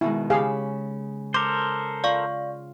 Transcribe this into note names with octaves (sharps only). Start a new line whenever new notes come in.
B2 D#3 G#3 E4
C#3 G4 G#4 F5 B5
A4 A#4 C5 D6
F4 D5 F5 C#6